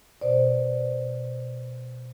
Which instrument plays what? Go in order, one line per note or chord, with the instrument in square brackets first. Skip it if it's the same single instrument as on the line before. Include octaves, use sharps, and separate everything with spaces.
[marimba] B2 C5 D5